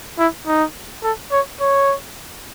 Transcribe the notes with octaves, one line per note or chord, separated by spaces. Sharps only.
E4
D#4
A4
C#5
C#5